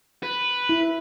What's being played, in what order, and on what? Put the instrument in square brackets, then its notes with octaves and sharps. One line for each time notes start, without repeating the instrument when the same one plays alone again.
[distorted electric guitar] B4
[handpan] E4